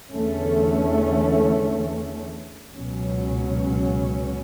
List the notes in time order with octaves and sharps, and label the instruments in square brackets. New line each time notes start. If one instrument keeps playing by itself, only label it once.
[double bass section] E2 D3 A3 C#4
C#2 B2 F#3 C#4